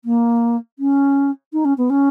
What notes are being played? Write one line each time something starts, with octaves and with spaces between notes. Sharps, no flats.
A#3
C#4
D#4
C#4
B3
C#4